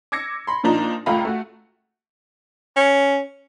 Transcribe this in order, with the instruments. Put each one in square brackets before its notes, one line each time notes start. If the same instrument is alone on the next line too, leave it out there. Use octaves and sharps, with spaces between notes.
[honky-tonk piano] D6 E6 G#6 A#6 C#7
B5 C6
A#2 F3 D4 D#4
C#2 A3 F4 G5 A#5 B5
A3 F#4
[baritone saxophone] C#4